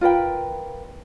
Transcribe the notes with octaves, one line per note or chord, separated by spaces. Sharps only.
F4 A#4 B4 G5